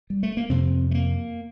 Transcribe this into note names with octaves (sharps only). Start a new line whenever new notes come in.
G3
A3
A#3
F2 C3 C4
A3
A#3